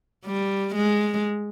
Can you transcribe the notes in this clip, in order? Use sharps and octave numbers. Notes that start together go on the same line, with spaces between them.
G3
G#3